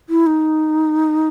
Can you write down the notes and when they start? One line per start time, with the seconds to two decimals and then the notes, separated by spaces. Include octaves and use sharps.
0.09 E4
0.27 D#4